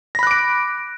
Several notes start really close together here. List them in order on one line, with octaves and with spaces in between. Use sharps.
A#6 B5 F#6 D6 D7